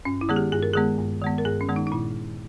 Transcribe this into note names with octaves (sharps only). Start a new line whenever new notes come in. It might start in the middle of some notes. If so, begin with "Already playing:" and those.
G2 C#4
E4
D#3 G#3 B3 G#4
G4
G2 G#4
A#4
D#3 G#3 B3 G#4
G2
D#3 G#3 B3
A#4
G2 G#4
C#4
D#3 G#3 B3
D#4
D#4
A#2 E4